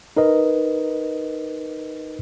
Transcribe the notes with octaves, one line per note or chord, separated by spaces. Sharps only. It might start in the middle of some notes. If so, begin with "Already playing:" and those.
D#4 A#4 B4 D#5